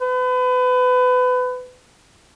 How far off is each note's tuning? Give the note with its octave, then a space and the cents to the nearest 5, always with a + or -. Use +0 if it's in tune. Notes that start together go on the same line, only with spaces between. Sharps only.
B4 +30